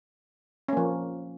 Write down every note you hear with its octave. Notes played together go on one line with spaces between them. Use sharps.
F3 A#3 C#4